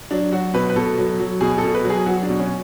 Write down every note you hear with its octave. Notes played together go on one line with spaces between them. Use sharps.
F#3 D4
F#3 F#4
B2 B4
B4
B2 A4
F#3
F#3
B2 G#4
A4
B2
B4
F#3
G#4
F#3 F#4
D4
B2
C#4